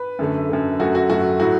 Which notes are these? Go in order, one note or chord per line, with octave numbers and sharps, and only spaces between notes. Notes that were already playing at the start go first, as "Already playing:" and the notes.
Already playing: B4
F#2 D3 A3
F#2 D3 A3
F#2 F#3 A3 F#4
F#4
F#2 F#3 A3 F#4
A2 F#3 A3 F#4